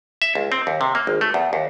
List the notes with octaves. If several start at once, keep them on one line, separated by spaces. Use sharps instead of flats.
E5
C#2
C4
D#2
C3
A#3
G#1
A3
E2
D#2